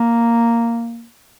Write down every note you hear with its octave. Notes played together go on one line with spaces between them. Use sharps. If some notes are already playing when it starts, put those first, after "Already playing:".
Already playing: A#3